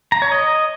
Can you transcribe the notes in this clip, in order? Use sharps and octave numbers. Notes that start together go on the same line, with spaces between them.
A#5
C#5
D#5